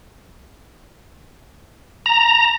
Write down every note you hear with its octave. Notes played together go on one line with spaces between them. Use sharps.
A#5